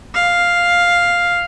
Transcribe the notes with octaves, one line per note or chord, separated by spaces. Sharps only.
F5